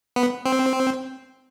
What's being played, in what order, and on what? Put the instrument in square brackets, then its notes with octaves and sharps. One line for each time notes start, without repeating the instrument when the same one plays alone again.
[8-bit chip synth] B3
C4